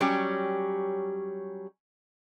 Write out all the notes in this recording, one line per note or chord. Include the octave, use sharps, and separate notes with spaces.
F#3 G3 C#4 G4